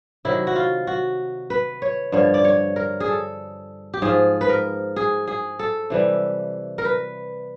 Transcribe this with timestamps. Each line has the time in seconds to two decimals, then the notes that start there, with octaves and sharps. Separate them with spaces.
0.25 C3 D#3 F#3 E4
0.47 F#4
0.56 F4
0.87 F#4
1.50 B4
1.82 C#5
2.12 G2 D3 F3 C#5
2.34 D5
2.44 C#5
2.76 A#4
3.00 G#4
3.08 A4
3.94 G4
4.02 G#2 F3 G#4
4.41 B4
4.49 A#4
4.96 G#4
5.28 G#4
5.59 A4
5.90 C3 E3 G3
6.78 A#4
6.85 B4